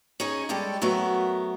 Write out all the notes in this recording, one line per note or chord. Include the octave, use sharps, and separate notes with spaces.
C#4 D#4 G#4 C#5
G3 G#3 G4 A4 D5
F#3 A3 B3 A#4